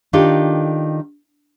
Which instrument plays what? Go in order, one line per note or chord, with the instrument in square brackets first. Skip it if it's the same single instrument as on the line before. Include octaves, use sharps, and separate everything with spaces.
[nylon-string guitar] D#3 D4 F4 G4 A4